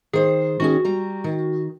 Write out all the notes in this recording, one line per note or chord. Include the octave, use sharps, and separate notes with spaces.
D#3 G#4 C5
D#3 C#4 F#4 G#4
G3 A#5
D#3